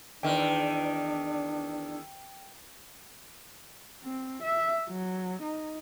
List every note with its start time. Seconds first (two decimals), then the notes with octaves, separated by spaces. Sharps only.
0.23 E2 D#3 D4 G5
4.03 C4
4.43 E5
4.89 F#3
5.42 D#4